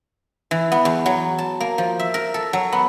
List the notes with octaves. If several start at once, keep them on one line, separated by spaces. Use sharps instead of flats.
E3
B3
E2
F#3
A5
A#3
F3
E5
A#4
A4
F#3
B3